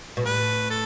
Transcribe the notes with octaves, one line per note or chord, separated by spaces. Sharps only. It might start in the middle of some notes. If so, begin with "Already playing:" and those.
B2
A2 B4
A4